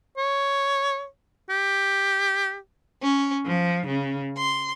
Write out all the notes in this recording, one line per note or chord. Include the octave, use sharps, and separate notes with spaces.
C#5
G4
C#4
F3
C#3
C6